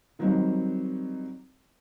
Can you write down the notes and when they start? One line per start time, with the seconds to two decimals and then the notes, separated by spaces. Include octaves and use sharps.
0.19 D#3 F#3 G3 C4 D#4